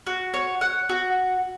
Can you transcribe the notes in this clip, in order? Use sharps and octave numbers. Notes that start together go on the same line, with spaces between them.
F#4
C#5
F#5
F#4